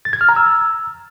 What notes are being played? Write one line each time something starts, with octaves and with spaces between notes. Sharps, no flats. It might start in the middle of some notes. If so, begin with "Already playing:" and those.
A6
G#6
F6
A#5
E6